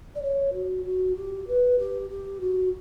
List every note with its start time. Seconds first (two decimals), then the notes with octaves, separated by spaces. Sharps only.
0.15 D5
0.22 C#5
0.53 F#4
0.84 F#4
1.15 G4
1.47 B4
1.79 G4
2.09 G4
2.40 F#4